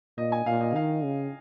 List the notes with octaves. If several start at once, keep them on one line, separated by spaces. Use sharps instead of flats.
A#2 D#5
G#5
A#2 F5
D#5
D#3 F5
C#3